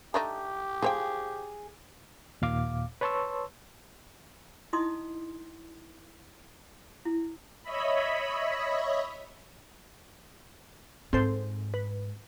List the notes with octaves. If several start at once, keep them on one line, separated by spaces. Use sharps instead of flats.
A3 D4 D#4 G4
F3 G#4 C5 G5
D#2 A#2 F5 D6
B4 C#5 A5 C6 C#6 E6
D#4 E4 D#5 C6 D#6
E4
C#5 D#5 E5 B5
G#2 C4 A4 C5
B4